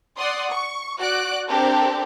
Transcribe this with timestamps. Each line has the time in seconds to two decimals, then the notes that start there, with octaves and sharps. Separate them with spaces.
0.18 D5 F#5 C6 D#6
0.50 C#6
0.98 F#4 D5 F#6 D7
1.49 C4 D4 G4 A4 A#4